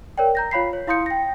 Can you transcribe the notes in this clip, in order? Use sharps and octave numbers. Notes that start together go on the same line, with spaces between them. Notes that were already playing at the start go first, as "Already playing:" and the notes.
A#4 C#5 D5 G5
A#5 G6 A#6
F4 C#5 F5 B5 B6 C7
C#5
E4 F5 C6 D#6 G6 C#7
G5 A#6